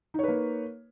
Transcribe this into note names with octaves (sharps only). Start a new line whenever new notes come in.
A#3 D#4 B4 C#5